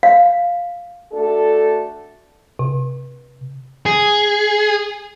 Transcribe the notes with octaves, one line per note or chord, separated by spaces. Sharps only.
F5
A3 D4 F#4 A4
C3
G#4